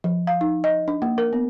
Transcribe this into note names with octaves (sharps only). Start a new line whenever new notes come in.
F3
F5
D#4
D#5
D4
A#3
A#4
B3